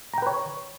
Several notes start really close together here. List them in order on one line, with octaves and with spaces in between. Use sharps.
A#5 G5 B4 C#5